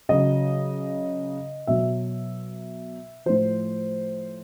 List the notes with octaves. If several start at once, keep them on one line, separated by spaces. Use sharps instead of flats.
C#3 F#3 D#5
B2 F#3 E5
A2 F3 C5